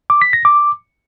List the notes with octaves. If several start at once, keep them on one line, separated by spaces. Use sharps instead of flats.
D6
B6
A#6
D6